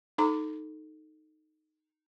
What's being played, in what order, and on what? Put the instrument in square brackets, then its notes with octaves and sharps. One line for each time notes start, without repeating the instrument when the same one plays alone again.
[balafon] D#4 A4 A#5 D6